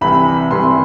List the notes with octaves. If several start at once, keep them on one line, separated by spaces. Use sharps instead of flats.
C2 C3 E3 G3 B5
C2 C3 E3 G3 C6